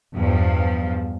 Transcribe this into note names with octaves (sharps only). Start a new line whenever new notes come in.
E2 G2 F3